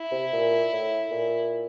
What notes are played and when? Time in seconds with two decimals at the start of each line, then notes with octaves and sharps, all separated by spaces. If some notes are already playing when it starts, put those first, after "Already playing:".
Already playing: E4
0.12 C3
0.33 A#2
0.72 A2
1.11 A#2